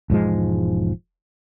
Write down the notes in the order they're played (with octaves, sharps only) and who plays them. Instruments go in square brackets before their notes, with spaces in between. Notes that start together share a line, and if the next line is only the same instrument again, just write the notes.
[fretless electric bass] E1 G#2 F3 G#3